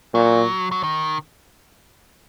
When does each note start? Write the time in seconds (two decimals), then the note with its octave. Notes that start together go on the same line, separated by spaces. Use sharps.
0.14 A#2 F#3
0.71 F#3
0.83 D#3